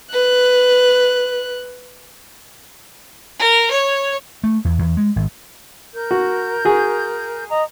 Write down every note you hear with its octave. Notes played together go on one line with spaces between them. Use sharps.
B4 F#6
A#4
C#5
A3
E2
E2
G#3
G#1
A#4 G6
F#4
F#4 G#4
D#5 A#5